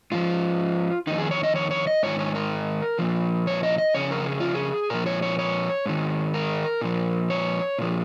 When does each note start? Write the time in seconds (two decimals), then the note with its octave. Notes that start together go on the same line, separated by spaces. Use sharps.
0.12 G#2 F3 F4
1.07 F2 D#3 D#4
1.18 G#4
1.31 C#5
1.43 D#5
1.55 C#5
1.71 C#5
1.87 D#5
2.03 G#2 D#3 C#5
2.19 C#5
2.35 A#4
2.99 A#2 F3
3.47 C#5
3.63 D#5
3.78 D#5
3.94 F2 C#3 C#5
4.11 A#4
4.26 G#4
4.40 F4
4.55 G#4
4.90 A#2 F3 A#4
5.06 C#5
5.22 C#5
5.39 C#5
5.86 G#2 D#3
6.34 A#4
6.81 A#2 F3
7.30 C#5
7.78 A#2 F3